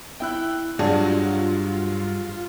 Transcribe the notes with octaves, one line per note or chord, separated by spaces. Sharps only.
E4 E5 G5 F#6
G2 F#3 D4 F4 F#4 G#4